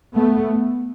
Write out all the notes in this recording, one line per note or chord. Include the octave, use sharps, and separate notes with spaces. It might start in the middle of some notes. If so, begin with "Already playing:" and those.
A3 B3